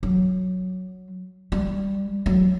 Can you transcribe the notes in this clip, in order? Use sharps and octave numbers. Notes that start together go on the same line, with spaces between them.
F#3
G3
F#3